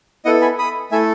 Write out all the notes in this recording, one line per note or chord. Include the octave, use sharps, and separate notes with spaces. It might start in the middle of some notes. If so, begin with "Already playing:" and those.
B3 E4 A4 D#5 F#5
G#5 B5
B5 D#6
A3 E4 A4 E5 G#5